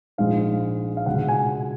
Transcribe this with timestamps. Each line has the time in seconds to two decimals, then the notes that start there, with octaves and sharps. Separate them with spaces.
0.18 A#1 G#2 F3 G#3 F5
0.97 F5
1.06 C#2 B2 G#3 F#5
1.28 G#5